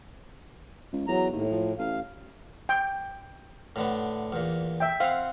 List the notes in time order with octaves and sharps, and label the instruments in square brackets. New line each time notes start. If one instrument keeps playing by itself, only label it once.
[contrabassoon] C#2
[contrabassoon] E2 [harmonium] F#3 A#5
[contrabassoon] D#2 [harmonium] A2
[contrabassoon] F3
[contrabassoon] A1 [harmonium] F5
[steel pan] G5
[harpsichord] A2 D3 B3
E2 A#2
[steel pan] E5 G5
[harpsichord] C4 F#5 [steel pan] F5